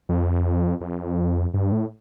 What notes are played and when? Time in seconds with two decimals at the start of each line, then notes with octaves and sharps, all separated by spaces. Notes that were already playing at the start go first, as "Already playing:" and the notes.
0.09 F2
0.81 F2
1.54 G2
1.72 A2